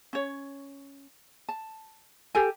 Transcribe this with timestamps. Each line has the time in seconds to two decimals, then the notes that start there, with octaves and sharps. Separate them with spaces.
0.13 C#4 C#5
1.49 A5
2.35 G4 A4 G#5